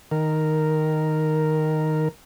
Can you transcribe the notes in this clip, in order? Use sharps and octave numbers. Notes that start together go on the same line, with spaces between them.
D#3 A#4